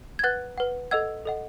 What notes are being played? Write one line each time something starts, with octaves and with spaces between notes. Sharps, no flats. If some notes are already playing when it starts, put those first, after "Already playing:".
G#6
B4 F#5 F#6 A6
B4 F#5
A4 D#5 F#5 E6 G#6
A4 D#5 F#5